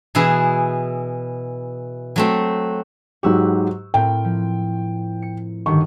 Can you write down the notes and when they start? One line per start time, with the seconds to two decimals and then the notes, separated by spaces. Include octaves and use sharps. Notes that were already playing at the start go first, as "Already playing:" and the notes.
0.15 B2 E3 E4 G#4
2.16 F#3 A3 C4
3.23 G#2 F#3 G4 C#6 E6 F#6
3.94 A2 C4 A#4 G5
4.24 F3
5.22 C#7
5.66 G1 D#3 G4 C#6